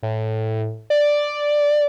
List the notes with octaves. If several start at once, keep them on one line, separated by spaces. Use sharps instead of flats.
A2
D5